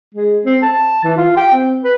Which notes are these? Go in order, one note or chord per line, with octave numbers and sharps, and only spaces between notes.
G#3
C4
A5
E3
F4
G5
C4
B4